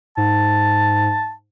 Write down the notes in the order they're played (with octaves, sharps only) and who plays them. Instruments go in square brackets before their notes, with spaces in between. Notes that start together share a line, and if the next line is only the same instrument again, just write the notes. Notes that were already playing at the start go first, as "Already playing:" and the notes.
[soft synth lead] G#2 [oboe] A5